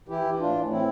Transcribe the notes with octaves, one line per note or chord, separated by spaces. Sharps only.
E3 E4 G4
E3
A2 D4 F4
A2
E3 C4 E4